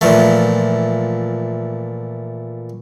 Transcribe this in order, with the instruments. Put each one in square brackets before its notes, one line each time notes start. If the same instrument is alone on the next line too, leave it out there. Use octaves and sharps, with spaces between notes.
[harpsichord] A#2 E3 F3 A3